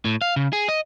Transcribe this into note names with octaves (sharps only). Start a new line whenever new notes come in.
A2
F5
C#3
G#4
D#5